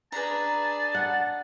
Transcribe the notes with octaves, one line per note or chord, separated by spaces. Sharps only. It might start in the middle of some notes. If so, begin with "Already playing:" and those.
D4 G#4 B4 A5 A#5
F#5